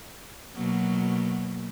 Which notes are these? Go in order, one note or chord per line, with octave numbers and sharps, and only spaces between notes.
B2 F#3 A#3